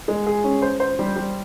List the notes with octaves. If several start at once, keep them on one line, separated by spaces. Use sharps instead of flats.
G#3
G#4
C#4
C5
C5
G3
G3